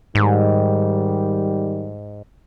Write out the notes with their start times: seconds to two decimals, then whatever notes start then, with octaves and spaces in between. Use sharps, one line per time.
0.15 G#2 D#3 G3